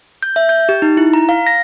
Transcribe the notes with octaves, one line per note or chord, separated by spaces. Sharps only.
G6
E5
G6
G4
D#4
E4
A#5
F5
A#6